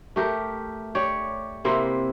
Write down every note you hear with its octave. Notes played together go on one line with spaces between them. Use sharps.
A3 G4 A#4
G4 C#5 D5
C3 A#3 C4 E4